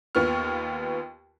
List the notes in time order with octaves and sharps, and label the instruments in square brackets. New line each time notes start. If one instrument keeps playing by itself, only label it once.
[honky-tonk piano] D#2 B3 F4 C#6 F6